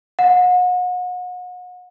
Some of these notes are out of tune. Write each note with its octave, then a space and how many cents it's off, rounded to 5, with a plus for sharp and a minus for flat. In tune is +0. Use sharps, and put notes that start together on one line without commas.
F#5 -40